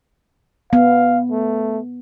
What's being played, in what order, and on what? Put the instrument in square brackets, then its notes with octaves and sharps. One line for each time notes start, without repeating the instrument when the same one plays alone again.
[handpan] B3 [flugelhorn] F5
[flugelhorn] A3